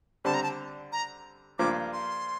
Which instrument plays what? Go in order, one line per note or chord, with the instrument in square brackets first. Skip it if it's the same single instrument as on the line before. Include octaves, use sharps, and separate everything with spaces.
[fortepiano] D3 G3 C4 [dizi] A5
[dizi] A#5
A5
A#5
[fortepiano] G2 F3 A#3 [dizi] D6
[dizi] C6